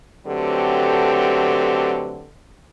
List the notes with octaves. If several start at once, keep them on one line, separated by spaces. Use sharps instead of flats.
D3 F#3 A3 C4 G4 B4